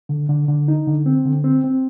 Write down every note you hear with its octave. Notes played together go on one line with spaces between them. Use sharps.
D3
D3
D3
D#4
D3
C4
D3
C4
C4